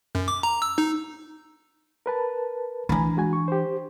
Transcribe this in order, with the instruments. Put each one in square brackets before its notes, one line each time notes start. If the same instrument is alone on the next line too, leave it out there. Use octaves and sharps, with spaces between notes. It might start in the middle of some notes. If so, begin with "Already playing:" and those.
[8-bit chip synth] F#2
D6
A#5
E6
D#4
[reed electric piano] A#4 B4 A5
[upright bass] E3 D4 [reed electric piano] G#5 A#5 B5
[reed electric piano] G#3 F#4 G#5
C#6
G4 C5